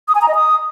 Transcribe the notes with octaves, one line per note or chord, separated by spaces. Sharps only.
D#6
G#5
A#5
D#5
D#6